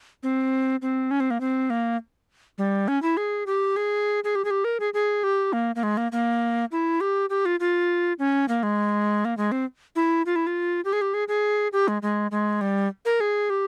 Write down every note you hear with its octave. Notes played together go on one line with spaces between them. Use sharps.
C4
C4
C#4
C4
A#3
C4
A#3
G3
C#4
E4
G#4
G4
G#4
G#4
G4
G#4
G4
A#4
G#4
G#4
G4
A#3
A#3
G#3
A#3
A#3
E4
G4
G4
F4
F4
C#4
A#3
G#3
A#3
G#3
C4
E4
F4
E4
F4
G4
G#4
G4
G#4
G#4
G4
G#3
G#3
G#3
G3
A#4
G#4
G4